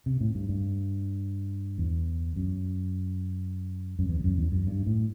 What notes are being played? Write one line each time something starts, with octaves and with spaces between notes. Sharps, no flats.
C3
A2
G2
G2
E2
F#2
F#2
E2
E2
F#2
E2
F#2
G2
A2